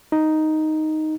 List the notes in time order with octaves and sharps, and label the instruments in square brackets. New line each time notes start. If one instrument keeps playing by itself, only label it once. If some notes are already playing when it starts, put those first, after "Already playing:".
[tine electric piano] D#4